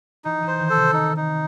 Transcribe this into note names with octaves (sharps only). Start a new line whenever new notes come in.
E3 D#4
E3 C5
D#3
A4
C3
D#4
D#4